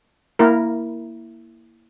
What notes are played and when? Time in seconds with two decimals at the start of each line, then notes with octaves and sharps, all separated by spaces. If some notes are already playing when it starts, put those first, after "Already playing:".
0.39 A#3 E4 A#4